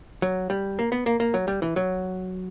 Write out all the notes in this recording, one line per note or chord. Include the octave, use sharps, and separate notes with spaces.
F#3
G3
A#3
B3
A#3
A#3
F#3
G3
E3
F#3